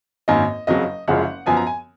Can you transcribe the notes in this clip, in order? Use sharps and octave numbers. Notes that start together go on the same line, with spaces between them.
G#1 F#2 D#3 A#3 D#5
F#1 F2 C#3 F#3 D#5
F#1 F#2 C#3 F3 G#3 F#5
F#2 F3 B3 G#5
A#5
G#5